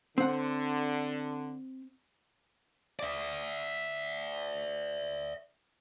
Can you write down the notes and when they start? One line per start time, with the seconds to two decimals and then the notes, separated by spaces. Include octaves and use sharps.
0.18 D3 C4 F#5
2.99 D5 E5